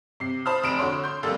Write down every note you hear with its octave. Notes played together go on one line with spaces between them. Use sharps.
C3 C7
C5 A5 B5 D#6 F6
F1 B5 D7 E7
D3 F#4 C#5 C6
C6 G6
F1 G3 A#3 A4 E6